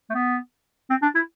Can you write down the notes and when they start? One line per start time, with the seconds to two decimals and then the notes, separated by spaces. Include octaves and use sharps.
0.10 A3
0.14 B3
0.90 C4
1.02 D4
1.15 E4